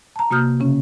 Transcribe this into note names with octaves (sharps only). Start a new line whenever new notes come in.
A5 A#5
C3 A#3 F#4 D#6 F6 G6
C#3 C#4